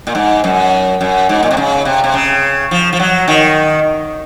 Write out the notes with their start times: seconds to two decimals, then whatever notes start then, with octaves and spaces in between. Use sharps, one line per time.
0.07 A#2
0.15 G#2
0.44 F#2
1.01 F#2
1.29 G#2
1.43 A#2
1.51 C3
1.57 C#3
1.85 C3
2.04 C3
2.14 C#3
2.71 F3
2.93 F3
3.00 F#3
3.28 D#3